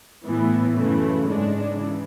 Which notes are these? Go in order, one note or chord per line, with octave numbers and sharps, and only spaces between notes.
A2 E3 B3
F#2 C#3 E3 A3
G#2 G#3 D4
C#3 E3